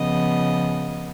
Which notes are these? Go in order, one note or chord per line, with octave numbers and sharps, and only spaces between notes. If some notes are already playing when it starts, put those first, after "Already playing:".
Already playing: C#3 F3 B3 D#5